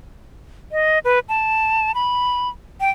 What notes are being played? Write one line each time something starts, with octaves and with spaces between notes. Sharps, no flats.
D#5
B4
A5
B5
G5